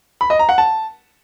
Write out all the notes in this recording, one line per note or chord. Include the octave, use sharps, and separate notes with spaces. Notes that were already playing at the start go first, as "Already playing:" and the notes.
B5
D#5
A#5
F#5
A5